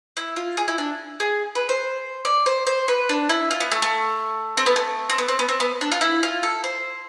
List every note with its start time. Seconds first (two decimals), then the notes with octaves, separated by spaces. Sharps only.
0.17 E4
0.36 F4
0.57 G#4
0.68 E4
0.78 D4
1.20 G#4
1.55 B4
1.69 C5
2.25 D5
2.46 C5
2.67 C5
2.88 B4
3.09 D4
3.29 E4
3.51 F4
3.60 B3
3.72 A3
3.82 A3
4.57 C4
4.66 B3
4.76 A3
5.10 C4
5.18 B3
5.28 C4
5.39 B3
5.49 C4
5.60 B3
5.81 D4
5.92 F4
6.01 E4
6.23 F4
6.43 A4
6.64 C5